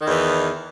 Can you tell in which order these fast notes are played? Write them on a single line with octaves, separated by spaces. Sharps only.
D#3 E2 E3